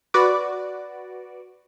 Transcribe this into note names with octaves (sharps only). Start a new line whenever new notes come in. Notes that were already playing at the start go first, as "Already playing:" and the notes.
F#4 B4 D5